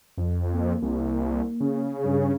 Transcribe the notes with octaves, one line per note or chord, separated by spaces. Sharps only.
F2
A#3
C2
C#3
G2